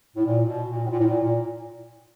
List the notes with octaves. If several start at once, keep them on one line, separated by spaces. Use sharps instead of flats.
A2
A#2
B2
A#2
A2
A#2
A2
A#2
A#2